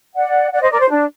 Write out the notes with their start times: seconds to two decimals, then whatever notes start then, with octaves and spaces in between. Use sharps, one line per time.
0.15 D5 F#5
0.52 D5 F#5
0.61 C5 D#5
0.71 A#4 D5
0.80 C5
0.89 D4